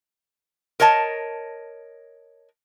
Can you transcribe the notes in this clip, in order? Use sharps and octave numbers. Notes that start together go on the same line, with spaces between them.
A#4 C#5 D#5 A5